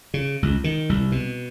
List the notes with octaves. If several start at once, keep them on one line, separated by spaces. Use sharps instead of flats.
C#3
C#2
D#3
C2
B2